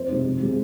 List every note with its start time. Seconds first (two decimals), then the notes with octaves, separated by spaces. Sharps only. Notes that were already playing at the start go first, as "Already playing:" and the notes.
Already playing: F2 C5
0.09 C3 G#3 D#4
0.25 F2
0.41 D#3 G#3